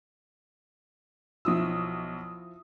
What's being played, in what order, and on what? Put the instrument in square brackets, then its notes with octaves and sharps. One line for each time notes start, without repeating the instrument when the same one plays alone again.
[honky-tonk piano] B1 D#6 E6 [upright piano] F3 E4 F4